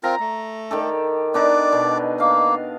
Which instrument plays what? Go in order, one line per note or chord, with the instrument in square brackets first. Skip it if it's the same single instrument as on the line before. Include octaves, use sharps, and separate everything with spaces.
[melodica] C4 F4 A#4 [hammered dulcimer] A#5
[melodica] A3
[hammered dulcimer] D#3 G4 A4
[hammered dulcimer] B3 D4 D#4 [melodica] D5
[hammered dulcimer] B2
[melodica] A#3 [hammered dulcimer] F5